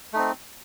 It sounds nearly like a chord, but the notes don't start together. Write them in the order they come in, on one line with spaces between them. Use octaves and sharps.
A3 D#4 C4